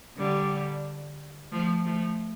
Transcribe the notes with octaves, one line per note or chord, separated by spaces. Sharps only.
D3 G3
F3 A3
F3 A3